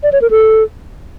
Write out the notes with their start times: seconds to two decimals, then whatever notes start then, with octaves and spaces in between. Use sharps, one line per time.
0.03 D5
0.12 C#5
0.21 A#4
0.31 A4